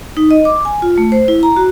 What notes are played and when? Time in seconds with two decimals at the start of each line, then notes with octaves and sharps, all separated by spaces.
0.17 D#4
0.31 D#5
0.45 D6
0.65 G#5
0.82 F4
0.98 A3
1.12 C5
1.28 E4
1.43 A#5
1.57 F#4